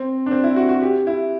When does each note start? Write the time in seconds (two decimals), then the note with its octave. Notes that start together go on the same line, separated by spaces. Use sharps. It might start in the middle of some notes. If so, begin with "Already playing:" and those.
Already playing: C4
0.26 D4
0.31 C4
0.44 E4
0.56 F#4
0.69 F#4
0.82 G4
1.07 E4